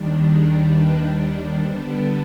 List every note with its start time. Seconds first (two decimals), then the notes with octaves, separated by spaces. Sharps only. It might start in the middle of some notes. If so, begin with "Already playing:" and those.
Already playing: D#2 D#3 G3 D4
0.23 G#4
0.68 B4
1.57 D3 G3 B3 D4 C5